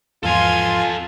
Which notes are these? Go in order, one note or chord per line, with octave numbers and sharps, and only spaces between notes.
E2 G#2 F3 F4 A4 F5 G#5 C6